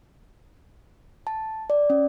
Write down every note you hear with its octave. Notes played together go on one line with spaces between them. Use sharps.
A5
D5
C#4